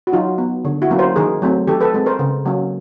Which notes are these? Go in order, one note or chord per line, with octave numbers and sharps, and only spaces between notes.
F#4
F#3 D#4 F4
B3
D3
E4 F#4
F#3 A#3 C#4
A#4 C5
D#3 G#4 A#4
F#3 A3 C4
D#3 G4 A4
A4 B4
G#3 C4
A#4 C5
C#3
F#3 A#3 C#4